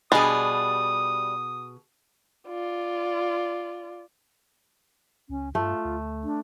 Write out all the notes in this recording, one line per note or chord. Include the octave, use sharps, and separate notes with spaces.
B2 G3 D4 G#4 D#5 D#6
F4 D5
C#2 C#4
G2 A3 F4
D2
D4